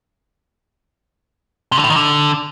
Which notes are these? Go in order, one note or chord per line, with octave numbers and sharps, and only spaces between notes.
C3
D3
A2
D#3
D3